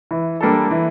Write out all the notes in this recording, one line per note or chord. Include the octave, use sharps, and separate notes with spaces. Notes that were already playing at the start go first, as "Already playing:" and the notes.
E3
G3 A#3 D4 A4
E3